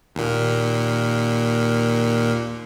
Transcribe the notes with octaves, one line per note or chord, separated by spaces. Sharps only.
D#2 A#2